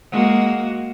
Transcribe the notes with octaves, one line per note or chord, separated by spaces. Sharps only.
G#3 A#3 F#4